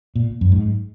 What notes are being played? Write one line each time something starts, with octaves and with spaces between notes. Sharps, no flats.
A#2
F#2
G#2